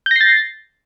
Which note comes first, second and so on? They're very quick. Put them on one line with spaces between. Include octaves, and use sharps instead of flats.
G6 A#6 C7 A6